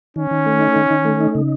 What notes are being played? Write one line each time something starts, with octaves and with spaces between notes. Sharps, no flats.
D#3 C#4
D#3
A3
D#4
D#3
D#3
A3
D#4
C#3